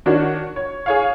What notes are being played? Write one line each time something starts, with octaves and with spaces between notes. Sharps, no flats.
D#3 D4 F#4 C#5
C#5
G#4 C#5 F5